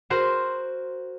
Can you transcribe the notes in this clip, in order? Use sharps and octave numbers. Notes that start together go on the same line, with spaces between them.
F#4 A#4 C5